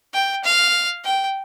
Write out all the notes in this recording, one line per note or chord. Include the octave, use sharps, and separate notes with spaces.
G5
F5
G5